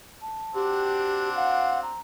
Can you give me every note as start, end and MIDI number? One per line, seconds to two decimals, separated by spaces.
0.22 1.36 81
0.55 1.98 60
0.55 1.98 62
0.55 1.98 66
0.55 1.30 67
1.36 1.80 77
1.36 1.80 78
1.83 2.00 82